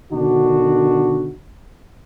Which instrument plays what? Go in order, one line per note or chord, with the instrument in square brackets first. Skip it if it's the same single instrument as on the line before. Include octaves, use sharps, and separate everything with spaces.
[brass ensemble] B2 D3 D#3 D4 F#4